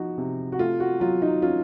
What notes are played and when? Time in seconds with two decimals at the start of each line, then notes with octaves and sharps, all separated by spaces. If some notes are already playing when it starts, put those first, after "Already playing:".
Already playing: F3 D#4 F#4
0.18 C3
0.52 F#4
0.59 A3 F4
0.80 F#4
1.00 F#3 F4
1.22 D#4
1.42 C#4 F4